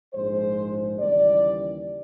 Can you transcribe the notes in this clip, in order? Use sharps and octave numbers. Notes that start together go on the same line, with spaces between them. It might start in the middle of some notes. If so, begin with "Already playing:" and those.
A#1 G#2 F3 G#3 C5
D#2 C#3 E3 G3 D5